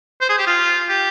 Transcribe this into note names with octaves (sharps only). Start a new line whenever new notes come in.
C5
G#4
G4
F4
G4